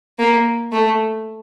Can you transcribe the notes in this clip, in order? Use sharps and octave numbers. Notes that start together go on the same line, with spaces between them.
A#3
A3